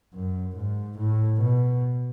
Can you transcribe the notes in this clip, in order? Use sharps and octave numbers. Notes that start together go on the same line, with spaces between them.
F#2
G#2
A2
B2